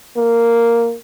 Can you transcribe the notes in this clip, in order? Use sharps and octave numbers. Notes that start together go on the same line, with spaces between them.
A#3